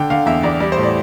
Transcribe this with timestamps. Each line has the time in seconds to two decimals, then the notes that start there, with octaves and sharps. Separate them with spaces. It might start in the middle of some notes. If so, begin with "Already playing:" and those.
Already playing: D3 G5
0.10 D3 F5
0.26 E2 E5
0.43 E2 D5
0.60 G3 D5
0.72 C5
0.77 A2
0.83 D5